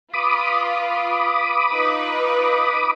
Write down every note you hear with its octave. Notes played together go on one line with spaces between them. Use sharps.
F4 B4 B5 D6 D#6
D#4 F4 B4